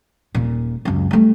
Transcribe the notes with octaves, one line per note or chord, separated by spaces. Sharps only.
D#1 A#2
C#2 F#2
G3 A3